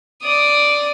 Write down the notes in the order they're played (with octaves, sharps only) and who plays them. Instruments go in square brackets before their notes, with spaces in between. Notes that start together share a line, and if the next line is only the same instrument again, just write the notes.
[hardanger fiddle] D5 D#6